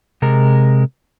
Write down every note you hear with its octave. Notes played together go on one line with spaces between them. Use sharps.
C3 G#3 A#4